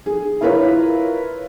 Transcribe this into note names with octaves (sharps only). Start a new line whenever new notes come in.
G#4
E4 F4 A#4 B4 C#5